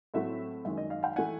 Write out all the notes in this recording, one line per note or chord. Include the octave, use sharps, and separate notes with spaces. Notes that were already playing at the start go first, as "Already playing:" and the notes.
A2 F#3 A3 C4 E5 F#5
F#2 D#3 G#3 E5
D#5
D#5 F5
F5 G5
E3 A3 F#5 G#5